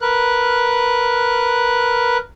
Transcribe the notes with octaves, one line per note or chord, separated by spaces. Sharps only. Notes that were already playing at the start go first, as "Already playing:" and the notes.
A#4 B4 F#6